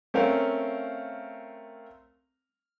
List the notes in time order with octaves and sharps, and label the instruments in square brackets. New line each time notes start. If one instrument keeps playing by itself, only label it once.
[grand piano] A3 C4 C#4 A#4 F5